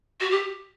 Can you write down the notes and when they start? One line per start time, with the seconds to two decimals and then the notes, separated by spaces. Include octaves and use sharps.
0.20 F#4
0.31 G4